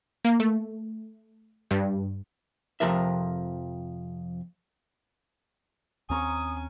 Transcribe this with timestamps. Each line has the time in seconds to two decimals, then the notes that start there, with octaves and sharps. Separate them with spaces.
0.25 A#3
0.40 A3
1.71 G2
2.80 F2 C3 F3 A#4 E5
6.10 D#2 C4 C#4 G#5 A#5 C#6 D#6